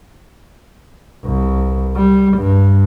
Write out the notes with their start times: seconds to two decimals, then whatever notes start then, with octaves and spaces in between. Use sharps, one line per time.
1.26 C2
1.97 G3
2.38 G2